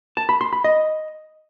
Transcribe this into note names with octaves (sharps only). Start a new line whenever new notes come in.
A5
B5
C6
B5
D#5